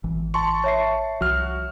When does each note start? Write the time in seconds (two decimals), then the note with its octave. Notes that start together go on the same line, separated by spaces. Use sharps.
0.04 G#1 E3
0.34 A5 C6 C#6
0.64 C#5 E5 C7
1.21 C2 F3 F#4 F6